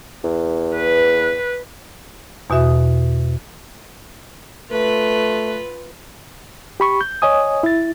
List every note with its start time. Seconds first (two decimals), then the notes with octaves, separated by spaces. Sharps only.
0.24 E2
0.75 B4
2.50 E2 B2 F#4 E5 D#6
4.72 A3 F4 B4
6.80 G4 B5 C#6
7.01 G6
7.22 C#5 D#5 G#5 D#6
7.63 E4 A6